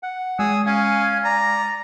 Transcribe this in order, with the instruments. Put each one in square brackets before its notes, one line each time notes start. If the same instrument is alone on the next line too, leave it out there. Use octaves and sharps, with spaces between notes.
[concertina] F#5
[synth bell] G#3 [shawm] G#4 [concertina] G#5 E6
[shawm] C#4 [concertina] F5 G#5
[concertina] D5 [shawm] A#5